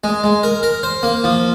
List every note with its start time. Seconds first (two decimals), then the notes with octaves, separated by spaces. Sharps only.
0.04 G#3
0.24 G#3
0.43 A#4
0.63 A#4
0.83 C5
1.03 A#3
1.24 F3